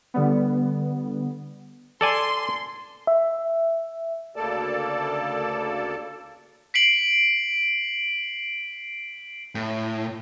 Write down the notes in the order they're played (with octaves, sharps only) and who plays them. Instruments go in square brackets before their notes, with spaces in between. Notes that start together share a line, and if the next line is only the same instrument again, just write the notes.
[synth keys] D3 G3 B3
[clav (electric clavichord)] A4 D5 G#5 [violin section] C6
[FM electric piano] E5
[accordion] D2 C#3 A#3 A4 D5 A5
[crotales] B6 C7 D7 F#7
[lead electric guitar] A2